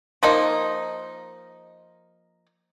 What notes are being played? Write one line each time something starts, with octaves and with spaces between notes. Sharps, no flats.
F3 A#3 D#4